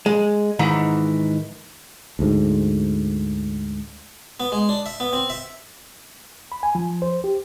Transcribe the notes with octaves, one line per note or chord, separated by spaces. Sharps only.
G#3
G#2 D#3 E3
D2 G#2
B3
G#3
D4
E5
B3
C4
E5
B5
G#5
F3
C5
G4